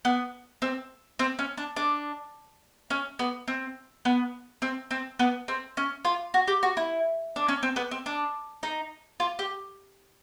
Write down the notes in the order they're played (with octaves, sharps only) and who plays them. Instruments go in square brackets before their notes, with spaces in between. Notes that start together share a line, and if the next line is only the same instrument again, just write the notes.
[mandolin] B3
C4
C4
C#4
D4
D4
C#4
B3
C4
B3
C4
C4
B3
C4
C#4
F4
F#4
G4
F#4
E4
D4
C#4
C4
B3
C4
D4
D#4
F4
G4